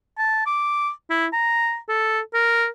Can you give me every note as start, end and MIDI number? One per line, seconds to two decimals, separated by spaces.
0.18 0.45 81
0.46 0.90 86
1.10 1.26 64
1.33 1.78 82
1.89 2.20 69
2.34 2.66 70